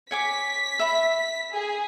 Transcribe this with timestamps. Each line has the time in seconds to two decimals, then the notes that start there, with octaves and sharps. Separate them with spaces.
0.11 C#5 G#5 D6 B6
0.79 E5 B5
1.51 G#4